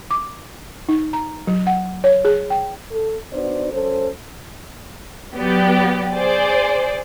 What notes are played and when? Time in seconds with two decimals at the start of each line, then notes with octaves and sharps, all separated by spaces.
0.11 D6
0.89 D#4
1.13 A#5
1.47 F#3
1.67 F#5
2.04 C#5
2.25 G#4
2.50 G5
2.91 A4
3.32 B3 D4 D#4 F#4 C5 D5
3.72 F#3 C#4 A4 C5
5.36 F#3 B3 G4 D5
6.12 G#4 C5 D5